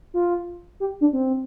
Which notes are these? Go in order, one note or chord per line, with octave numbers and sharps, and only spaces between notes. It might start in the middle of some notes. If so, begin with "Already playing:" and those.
F4
G4
D4
C4